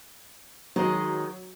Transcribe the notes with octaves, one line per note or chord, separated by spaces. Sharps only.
D#3 F#3 G#3